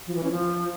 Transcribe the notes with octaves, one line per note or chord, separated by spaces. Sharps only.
F3
E3
C#4
F3